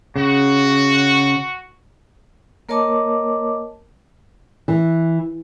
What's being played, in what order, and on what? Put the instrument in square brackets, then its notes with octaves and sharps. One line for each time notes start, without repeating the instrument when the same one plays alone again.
[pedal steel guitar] C#3 [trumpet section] F#4
[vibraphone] A#3 A#4 C#5 D#5 A5 D6
[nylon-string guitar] E3